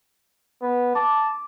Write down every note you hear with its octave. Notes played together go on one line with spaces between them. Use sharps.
B3
A5 D6